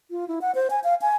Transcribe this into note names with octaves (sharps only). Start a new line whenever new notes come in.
F4
E4
F#5
C5
G#5
F5
G#5